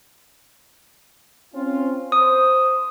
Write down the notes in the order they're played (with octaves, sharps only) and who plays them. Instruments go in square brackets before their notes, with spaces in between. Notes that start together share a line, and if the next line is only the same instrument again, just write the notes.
[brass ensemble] C4 C#4 F4
[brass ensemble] C5 [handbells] D#6